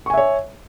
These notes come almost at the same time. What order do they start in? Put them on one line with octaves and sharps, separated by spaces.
C#6 G#5 E5 C#5